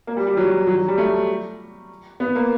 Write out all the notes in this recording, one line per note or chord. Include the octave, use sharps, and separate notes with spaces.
A#3
G3
G3
F#3
F#3
F#3
G3
A3
B3
A#3